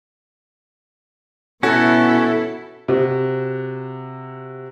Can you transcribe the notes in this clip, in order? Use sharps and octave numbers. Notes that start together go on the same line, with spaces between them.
B2 B3 C#4 E4 F#4 A4
C3 F#4